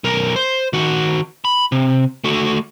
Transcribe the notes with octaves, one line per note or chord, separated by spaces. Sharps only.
B1 A#4
C5
D#3 F#4
B5
C3
A3 F#4